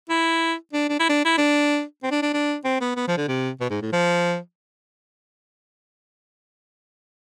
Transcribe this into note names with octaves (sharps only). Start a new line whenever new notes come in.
E4
D4
D4
E4
D4
E4
D4
C4
D4
D4
D4
C4
B3
B3
F3
D3
C3
B2
G#2
A2
F3